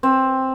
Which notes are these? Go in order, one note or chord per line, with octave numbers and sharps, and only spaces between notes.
C4